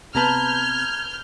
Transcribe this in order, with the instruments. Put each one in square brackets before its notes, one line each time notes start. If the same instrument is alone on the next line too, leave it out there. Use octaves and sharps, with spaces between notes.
[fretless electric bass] C3 B3 [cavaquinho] B4 A5 A#5 [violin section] F6 G6 [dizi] G#6